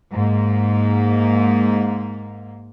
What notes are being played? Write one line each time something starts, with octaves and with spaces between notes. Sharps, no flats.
G#2 A#3